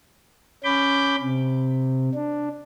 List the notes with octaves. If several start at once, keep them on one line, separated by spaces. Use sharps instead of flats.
C#4 B5 D6 G6
C3
D4